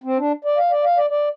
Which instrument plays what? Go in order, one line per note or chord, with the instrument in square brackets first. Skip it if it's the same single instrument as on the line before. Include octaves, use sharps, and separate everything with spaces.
[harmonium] C4
D4
D5
F5
D5
F5
D5
D5